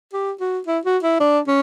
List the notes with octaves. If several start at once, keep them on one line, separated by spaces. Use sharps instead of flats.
G4
F#4
E4
F#4
E4
D4
C#4